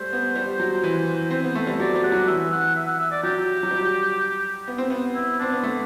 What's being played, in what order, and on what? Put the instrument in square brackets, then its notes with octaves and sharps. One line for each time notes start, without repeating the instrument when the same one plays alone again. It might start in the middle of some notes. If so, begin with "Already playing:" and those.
Already playing: [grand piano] G3 A3 [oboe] C5
[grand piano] B3
G3
F#3
E3
C4
B3
A3
G3
[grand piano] F#3 [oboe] D5
[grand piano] G3
[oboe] F#5
[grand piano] F#3
[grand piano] E3 [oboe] E5
[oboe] F#5
E5
F#5
E5
D5
[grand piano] F#3 [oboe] G4
[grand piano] F#3
G3
B3
C4
B3
[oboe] E4
[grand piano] C4 [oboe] D4
[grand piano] B3
A3